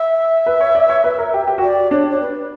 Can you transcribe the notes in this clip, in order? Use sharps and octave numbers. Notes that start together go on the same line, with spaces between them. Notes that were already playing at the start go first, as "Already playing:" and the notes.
Already playing: E5
B4
C#5
D5
C#5
B4
A#4
G4
G4
F#4
G4 D5
D4 C#5
C#5
B4